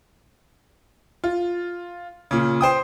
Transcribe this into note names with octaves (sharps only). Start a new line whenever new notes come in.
F4
A#2 C#3
C5 G5 D#6